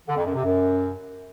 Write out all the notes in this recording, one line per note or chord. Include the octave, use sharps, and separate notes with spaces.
D3
F2
F#2
C3
F#2